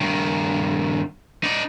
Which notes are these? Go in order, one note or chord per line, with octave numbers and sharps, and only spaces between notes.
G2 D#3
D#4 D5